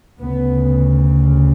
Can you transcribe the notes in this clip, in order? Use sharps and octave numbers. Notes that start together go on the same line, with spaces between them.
D2 C#3 B3